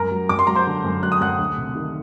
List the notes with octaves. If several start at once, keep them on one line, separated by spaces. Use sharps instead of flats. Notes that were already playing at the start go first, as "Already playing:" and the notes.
Already playing: F#2 A#4 A#5
F#3
F#2 D6
C6
F#3 A#5
C5 C6
D3
F#2
F#3 F#6
D#6
F#2 F#5 F#6
D2
C3
D#3